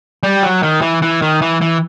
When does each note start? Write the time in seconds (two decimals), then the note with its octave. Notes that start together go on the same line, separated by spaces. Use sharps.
0.23 G3
0.43 F#3
0.63 D#3
0.82 E3
1.02 E3
1.22 D#3
1.42 E3
1.61 E3